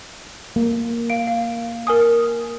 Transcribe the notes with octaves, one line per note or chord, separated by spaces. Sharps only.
A#3
F5 D7
F5
A#4 G#5 D#6